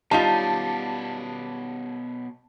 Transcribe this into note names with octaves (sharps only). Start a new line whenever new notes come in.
B2 G3 C#4 D#4 F4 A5